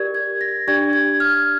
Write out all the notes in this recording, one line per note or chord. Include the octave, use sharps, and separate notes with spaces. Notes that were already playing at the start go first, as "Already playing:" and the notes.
Already playing: G4 A#4 D5 G#6
G#6
A#6
D4 G4 D5 G#6
G#6
F6